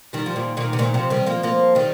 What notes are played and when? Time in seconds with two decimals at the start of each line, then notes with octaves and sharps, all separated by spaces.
0.13 D#3 G3
0.26 F3
0.36 A#2 D#3
0.57 A#2 D#3
0.73 C3
0.79 A#2 D#3
0.94 C3 F3
1.10 D#3 G3
1.26 F3 A#3
1.43 F3 A#3
1.75 D#3 G3